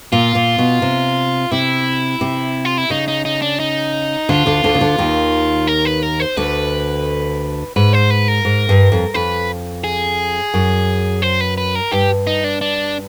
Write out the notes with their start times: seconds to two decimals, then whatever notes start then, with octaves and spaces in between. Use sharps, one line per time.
0.12 A#2 F4
0.35 A#2
0.58 B2
0.82 C3
1.51 C3 E4
2.21 C3
2.65 F4
2.78 E4
2.90 C#3 D#4
3.08 D#4
3.25 D#4
3.42 D4
3.60 D#4
4.29 D2 D3 F4
4.46 D2 D3
4.64 D2 D3
4.74 C#3
4.81 D2 D3
4.98 D#2 D#3
5.67 A#4
5.85 B4
6.03 A#4
6.20 C5
6.37 D2 D3 B4
7.76 G#2 B4
7.93 C5
8.10 B4
8.28 A#4
8.45 G#2
8.69 G2
8.92 F2
9.14 F2 B4
9.84 G#4
10.54 F#2
11.22 C5
11.41 B4
11.58 B4
11.75 A#4
11.91 G2 G4
12.27 D#4
12.44 D4
12.61 D4